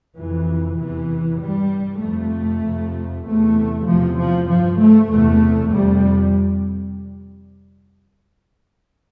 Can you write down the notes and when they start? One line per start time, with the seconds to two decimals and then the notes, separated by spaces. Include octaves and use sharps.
0.16 F2 C3 E3
0.78 E2 C3 E3
1.40 G2 G3
2.01 F2 C3 A3
2.63 F2 C3
3.25 E2 C3 A3
3.86 E2 C3 F3
4.18 F3
4.48 G2 F3
4.79 A3
5.09 E2 C3 A3
5.71 F2 C3 G3